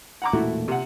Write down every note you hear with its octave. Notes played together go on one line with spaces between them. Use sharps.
F#5 A#5 D6
E1 A#2 A3 E4 F#4
C3 F#5